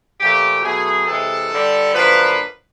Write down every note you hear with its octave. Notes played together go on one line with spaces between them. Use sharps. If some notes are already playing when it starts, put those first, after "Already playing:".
A#2 F3 A3 G4
B2 F#3 A3 G#4
C3 E3 G#3 A4
G2 D3 G3
F#2 D3 F3 A#3 B4